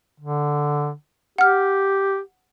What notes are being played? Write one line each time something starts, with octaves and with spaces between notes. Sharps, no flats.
D3
G4 F#5 F6